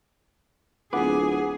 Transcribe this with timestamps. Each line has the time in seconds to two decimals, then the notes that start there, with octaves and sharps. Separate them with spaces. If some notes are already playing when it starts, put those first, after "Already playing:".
0.93 D1 B3 F4 G#4 B4 F#5 D6